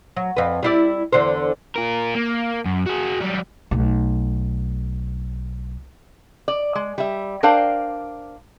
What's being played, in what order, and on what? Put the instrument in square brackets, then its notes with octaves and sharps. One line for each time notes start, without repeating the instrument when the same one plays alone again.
[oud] F#3
F2 B4
G3 E4 D5
E2 D3 C5
[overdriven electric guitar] F4 A#4
A#3
F#2
F#4 G#4
F#3 G3
[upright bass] B1 A3
[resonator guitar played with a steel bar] D5
G#3
G3 E5
D4 A#4 C5 D5 F5 G5